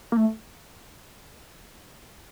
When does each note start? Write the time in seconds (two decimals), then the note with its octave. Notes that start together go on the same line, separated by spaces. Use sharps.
0.12 A#3
0.17 A3